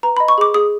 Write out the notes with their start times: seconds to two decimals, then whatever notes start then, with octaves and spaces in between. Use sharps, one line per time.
0.03 B4 A#5
0.17 D#5 B5
0.28 C#6
0.38 G#4 D6
0.54 G#4 D#6